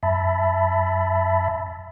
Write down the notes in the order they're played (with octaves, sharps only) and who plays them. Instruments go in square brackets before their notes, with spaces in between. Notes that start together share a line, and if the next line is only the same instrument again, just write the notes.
[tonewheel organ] F#2 E5 A5 B5